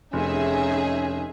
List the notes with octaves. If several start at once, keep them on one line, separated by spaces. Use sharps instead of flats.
F1 C#4 D#4 G#4 E5